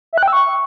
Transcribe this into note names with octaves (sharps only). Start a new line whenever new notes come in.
E5
F#6
G5
E6
C#6